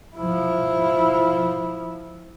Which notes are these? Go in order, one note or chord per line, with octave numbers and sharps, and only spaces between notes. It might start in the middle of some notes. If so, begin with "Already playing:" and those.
F3 E4